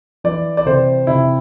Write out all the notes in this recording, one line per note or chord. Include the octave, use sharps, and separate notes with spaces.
E3 D5
D5
C3 C5
C3 E4